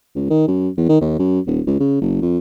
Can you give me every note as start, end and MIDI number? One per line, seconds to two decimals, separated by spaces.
0.15 0.28 37
0.30 0.48 51
0.48 0.69 42
0.77 0.86 40
0.89 0.98 51
1.01 1.16 39
1.19 1.39 42
1.47 1.61 27
1.67 1.80 37
1.80 1.96 49
2.01 2.19 30
2.22 2.38 41